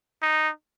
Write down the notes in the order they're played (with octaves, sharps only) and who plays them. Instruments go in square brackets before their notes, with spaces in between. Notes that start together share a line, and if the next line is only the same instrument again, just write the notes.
[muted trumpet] D#4